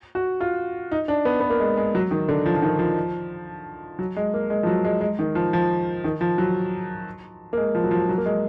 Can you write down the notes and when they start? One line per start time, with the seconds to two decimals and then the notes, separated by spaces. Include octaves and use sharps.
0.15 F#4
0.41 F4
0.92 D#4
1.08 D4
1.25 B3
1.40 B3
1.50 A#3
1.60 G#3
1.77 G#3
1.95 F#3
2.11 D#3
2.28 D3
2.46 F3
2.56 F3
2.62 D#3
2.79 F3
3.99 F#3
4.16 G#3
4.34 A#3
4.50 G#3
4.63 F3
4.67 F#3
4.85 G#3
5.01 G#3
5.19 D#3
5.35 F3
5.53 F3
6.04 D#3
6.21 F3
6.38 F#3
7.53 A#3
7.57 G#3
7.75 F3
7.84 F#3
7.91 F3
8.09 F#3
8.18 A#3
8.26 G#3